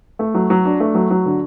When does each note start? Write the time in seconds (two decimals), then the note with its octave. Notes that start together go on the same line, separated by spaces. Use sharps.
0.19 A3
0.34 F#3
0.50 F#3
0.65 D4
0.80 A3
0.95 F#3
1.10 F#3
1.26 D3